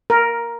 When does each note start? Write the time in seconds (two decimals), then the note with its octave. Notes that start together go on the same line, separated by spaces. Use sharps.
0.10 A#4